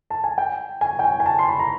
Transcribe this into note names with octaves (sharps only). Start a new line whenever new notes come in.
A5
G#5
G5
G#5
G5
G#5
G#5
A5
C6
B5
A#5